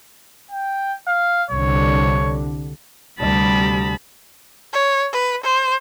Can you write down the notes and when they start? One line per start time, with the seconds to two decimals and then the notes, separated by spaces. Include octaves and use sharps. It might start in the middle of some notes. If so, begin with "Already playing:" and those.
0.51 G5
1.07 F5
1.50 C2 D3 C#5
3.20 D2 C3 G3 A5 B5
4.73 C#5
5.13 B4
5.44 C5